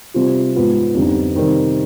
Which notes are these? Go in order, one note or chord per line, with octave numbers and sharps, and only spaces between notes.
C3 G3 C4 F4
G#2 F3 B3 F4
F2 D3 G3 B3 D#4
C3 D#3 G3 C4